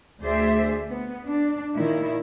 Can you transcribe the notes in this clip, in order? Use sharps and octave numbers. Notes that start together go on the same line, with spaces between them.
D2 G#4 C5 D5 E5
B3
D4
A#2 D#3 E4